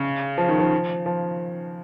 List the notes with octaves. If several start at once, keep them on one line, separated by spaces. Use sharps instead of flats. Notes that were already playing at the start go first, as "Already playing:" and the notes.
Already playing: C#3
F3
D#3
F3
F3